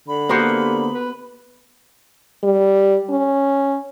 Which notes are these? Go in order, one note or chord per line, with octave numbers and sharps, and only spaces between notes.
D3 B5
A#3 B3 F#4 G4 C5 F#5
B4
G3
C#4